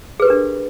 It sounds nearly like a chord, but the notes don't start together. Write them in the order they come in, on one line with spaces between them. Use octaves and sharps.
G#4 B4 G4 A#4 D4